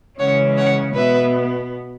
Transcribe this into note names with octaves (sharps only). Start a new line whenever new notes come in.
C#3 E3 G#3 C#4 C#5 F#5
C#5 F#5
B2 B3 B4 E5